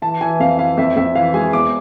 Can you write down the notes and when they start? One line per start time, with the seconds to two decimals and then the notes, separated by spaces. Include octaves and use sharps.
0.02 E3 A5
0.21 E3 G#5
0.40 F2 F5
0.59 E3 F5
0.77 F2 E5
0.96 F2 E5
1.15 E3 F5
1.34 G#3 G#5
1.53 E2 D6